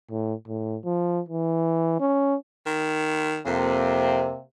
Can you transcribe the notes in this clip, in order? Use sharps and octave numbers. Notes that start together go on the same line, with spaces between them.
A2
A2
F3
E3
C#4
D#3
F2 C3 A#3